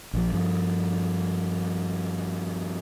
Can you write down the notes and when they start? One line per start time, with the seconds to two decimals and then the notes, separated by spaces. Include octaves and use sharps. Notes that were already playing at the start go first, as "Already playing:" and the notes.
0.13 A#1 F3
0.33 G2 F3